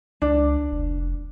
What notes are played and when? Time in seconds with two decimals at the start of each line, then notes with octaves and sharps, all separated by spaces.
0.22 C#2 D4
0.72 F1